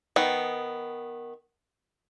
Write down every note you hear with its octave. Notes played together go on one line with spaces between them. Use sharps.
D#3 B3